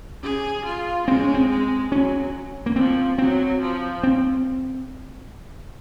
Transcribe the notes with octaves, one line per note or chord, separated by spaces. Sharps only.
C#4 G#4
F4
G#3 C4
C#4
C4
G#3
F#3 C#4
A#3
F3 C4
F#3 C4
F3
C4